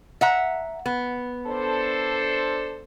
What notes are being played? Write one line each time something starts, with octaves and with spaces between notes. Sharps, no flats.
E5 F#5 A#5
B3
D4 A4 C5